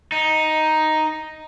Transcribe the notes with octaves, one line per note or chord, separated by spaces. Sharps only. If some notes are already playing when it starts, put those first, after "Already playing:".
D#4